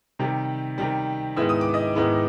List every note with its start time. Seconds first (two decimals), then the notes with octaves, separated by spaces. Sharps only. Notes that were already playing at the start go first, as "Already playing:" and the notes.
0.19 C3 D#3 G3
0.78 C3 D#3 G3
1.36 G#2 D#3 G#3 B3 E4 E6
1.49 D#6
1.61 D6
1.74 D#5 D#6
1.95 G#2 D#3 G#3 B3 E4